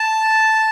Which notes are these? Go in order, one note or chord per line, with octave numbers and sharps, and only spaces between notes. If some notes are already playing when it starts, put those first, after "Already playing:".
Already playing: A5